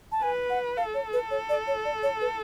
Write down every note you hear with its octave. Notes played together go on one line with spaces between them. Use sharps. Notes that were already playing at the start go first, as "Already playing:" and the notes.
A5
B4 G#5
F#5
A4 F5
C#5
B4
C#5
D5
C#5
D5
C#5
B4